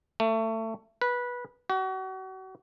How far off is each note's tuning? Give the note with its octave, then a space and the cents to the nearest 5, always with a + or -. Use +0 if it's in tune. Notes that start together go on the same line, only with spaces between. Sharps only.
A3 +25
B4 -15
F#4 +35